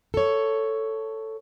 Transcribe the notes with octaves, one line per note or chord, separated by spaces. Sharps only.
A4 C#5